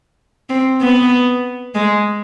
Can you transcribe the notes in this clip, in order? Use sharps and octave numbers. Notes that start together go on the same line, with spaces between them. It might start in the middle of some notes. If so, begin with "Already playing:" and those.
C4
B3
G#3